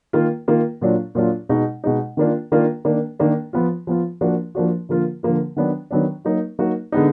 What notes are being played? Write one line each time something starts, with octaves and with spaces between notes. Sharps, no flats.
D#3 A#3 F4
D#3 A#3 F4
A#2 F#3 D4 F4
A#2 F#3 D4 F4
B2 G#3 D#4
B2 G#3 D#4
D#3 A#3 D4 F4
D#3 A#3 D4 F4
D#3 A#3 D4
D#3 A#3 D4
F3 B3 F4
F3 B3 F4
F3 A#3 D4 F#4
F3 A#3 D4 F#4
D3 F3 A#3 F4
D3 F3 A#3 F4
D#3 F#3 B3 D4
D#3 F#3 B3 D4
F#3 A#3 D#4 F#4
F#3 A#3 D#4 F#4
D3 G#3 B3 D#4